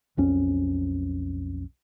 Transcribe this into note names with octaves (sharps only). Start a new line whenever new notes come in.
B1 F2 C#4